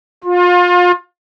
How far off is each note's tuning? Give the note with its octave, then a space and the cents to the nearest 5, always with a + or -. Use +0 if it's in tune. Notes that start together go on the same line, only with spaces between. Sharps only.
F4 +30